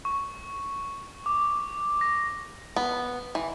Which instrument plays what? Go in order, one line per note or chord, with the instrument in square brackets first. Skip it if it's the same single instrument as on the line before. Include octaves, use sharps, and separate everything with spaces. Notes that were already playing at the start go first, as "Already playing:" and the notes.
[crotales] C#6
D6
A#6
[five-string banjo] B3
E3